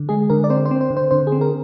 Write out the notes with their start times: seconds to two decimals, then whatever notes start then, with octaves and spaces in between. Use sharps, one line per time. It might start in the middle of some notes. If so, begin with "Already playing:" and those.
Already playing: D3
0.09 G#3 G#4
0.30 D3 A#4
0.44 D5
0.50 C4 C5
0.66 C5
0.71 C4
0.81 C5
0.91 D3
0.97 C5
1.11 D3 C5
1.27 G#4
1.32 C4
1.41 A#4